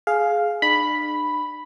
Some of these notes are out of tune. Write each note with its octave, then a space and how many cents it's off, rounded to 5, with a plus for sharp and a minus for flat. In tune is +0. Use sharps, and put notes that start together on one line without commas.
G#4 +15 F5 +0
D4 +45 B5 +0